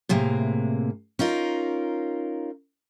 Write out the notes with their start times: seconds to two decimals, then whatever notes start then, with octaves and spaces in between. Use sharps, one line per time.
0.09 A2 C3 G#3 A#3
1.19 C#4 D#4 F4 A#4